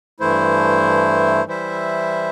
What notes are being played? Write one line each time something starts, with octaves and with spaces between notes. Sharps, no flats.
G2 E3 A3 E4 C5
E3 G3 E4 C5 E5